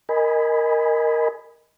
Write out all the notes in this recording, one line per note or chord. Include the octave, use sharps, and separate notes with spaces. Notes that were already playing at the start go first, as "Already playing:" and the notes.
A#4 D#5 G#5 B5